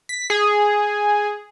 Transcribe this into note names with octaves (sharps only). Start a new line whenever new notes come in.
B6
G#4